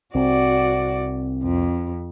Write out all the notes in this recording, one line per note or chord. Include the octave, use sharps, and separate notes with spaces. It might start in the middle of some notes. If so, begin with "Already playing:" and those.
C2 C4 F#4 D5
F2